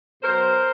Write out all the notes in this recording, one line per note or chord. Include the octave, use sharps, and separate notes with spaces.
B2 F#3 A#4 C5